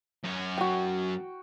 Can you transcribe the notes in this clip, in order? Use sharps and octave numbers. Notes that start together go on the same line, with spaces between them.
F#2 C#5
F#4 G5